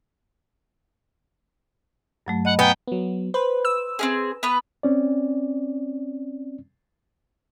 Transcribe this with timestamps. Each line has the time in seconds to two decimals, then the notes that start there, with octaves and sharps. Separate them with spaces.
2.26 G2 F#3 A3
2.45 D#5 F#5 B5
2.59 B3 G5 G#5 A#5
2.88 F#3 B3
3.34 B4 C5
3.65 E6
3.99 C4 C#4 G#4
4.43 B3 B4
4.83 C4 C#4 D5